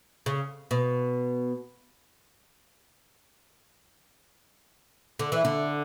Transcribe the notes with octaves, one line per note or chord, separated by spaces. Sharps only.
C#3
B2
D3
E3
D3